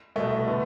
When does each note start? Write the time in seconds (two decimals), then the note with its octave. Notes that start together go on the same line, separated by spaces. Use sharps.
0.16 C2 B2 A3
0.47 D3 B3